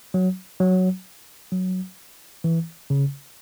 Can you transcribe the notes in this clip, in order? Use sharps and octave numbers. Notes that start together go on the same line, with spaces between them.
F#3
F#3
F#3
E3
C#3